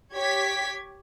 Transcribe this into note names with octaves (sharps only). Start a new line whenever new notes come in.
G4 C#5 G#6 B6